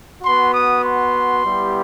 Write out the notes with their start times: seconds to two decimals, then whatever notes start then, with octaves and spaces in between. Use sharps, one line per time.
0.23 B3 F#4 C6
0.53 D#6
0.83 C6
1.44 G3 B3 E4 G4